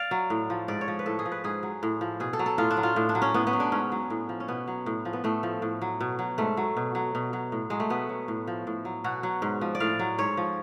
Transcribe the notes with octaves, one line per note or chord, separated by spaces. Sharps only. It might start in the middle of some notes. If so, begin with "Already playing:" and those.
Already playing: D5 F5
F#3
A2
F3
G#2 D5
C#5
F3
B4
A2 A4
G#4
F3
B4
G#2 G#4
F#3
A2
F3
B2 G#4
A4
F#3
A4
A2 F4
D4
F#3
F4
A2
D4
F#3
C#4
A2 B3
B3
F#3
D4
G#2 C#4
F#3
A2
F3
C#4
B2 B3
F#3
A2
F3
B3
A2 A3
F3
A2
F#3
B2
F#3
G#2 A3
F#3
B2
F#3
B2
F#3
A2
F#3 G#3
A3
B2 B3
F#3
A2
F3
A2
F#3
B2 F#4
F#3
G#2
F3
D5
A2 F5
F#3
G#2 C#5
F3